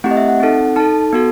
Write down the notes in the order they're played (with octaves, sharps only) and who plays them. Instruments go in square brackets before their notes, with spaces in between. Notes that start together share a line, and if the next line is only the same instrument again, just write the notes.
[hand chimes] A3 C4 E4 G4 F#5
D#5
E5
F#5
C4 D#4 A4
D#4 A4 A5
B3 F#4 A4